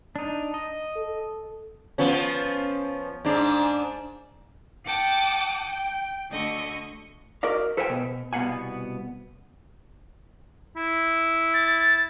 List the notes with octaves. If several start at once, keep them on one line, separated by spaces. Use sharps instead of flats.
D4 D#4
D#5
A4
F3 B3 C#4
G#2 D4
F#5 G5 A5 D6 D#6
G5
D2 D3 D#5 C#6
F#4 A#4 D5 D#5 F5
A4 B4 C5 F5 G5 G#5
B2
C2 B2 B3 F5 F#5 G#5
E4
A6